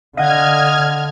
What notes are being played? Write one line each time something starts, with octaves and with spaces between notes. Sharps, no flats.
D3 D#5 F5 F#5 F6 G#6